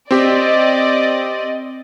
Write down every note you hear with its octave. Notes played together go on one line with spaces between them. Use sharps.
C4 G4 D5 D#5